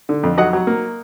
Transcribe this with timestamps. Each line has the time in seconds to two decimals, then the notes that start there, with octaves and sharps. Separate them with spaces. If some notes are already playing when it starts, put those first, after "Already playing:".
0.09 D3
0.23 F2
0.37 F#3 D#5 F#5
0.53 F#3
0.67 A#3